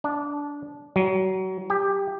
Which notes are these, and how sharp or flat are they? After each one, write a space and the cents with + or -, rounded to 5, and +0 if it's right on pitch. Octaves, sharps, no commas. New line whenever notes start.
D4 -20
F#3 +30
G4 +10